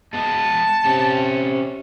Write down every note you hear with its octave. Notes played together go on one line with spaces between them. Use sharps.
G#3 B3 A5
C3 C#4 G4